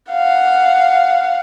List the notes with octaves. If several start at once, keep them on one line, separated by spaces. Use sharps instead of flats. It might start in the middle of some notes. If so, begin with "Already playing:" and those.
F5 F#5